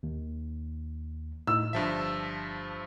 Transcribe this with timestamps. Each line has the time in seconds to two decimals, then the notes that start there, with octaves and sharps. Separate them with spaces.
0.03 D#2
1.47 A2 D#4 E6
1.73 G1 G2 F3 E5 A5